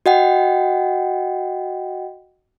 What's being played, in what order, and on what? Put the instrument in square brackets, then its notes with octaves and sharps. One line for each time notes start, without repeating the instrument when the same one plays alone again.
[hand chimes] F#4 D#5 F#5 G5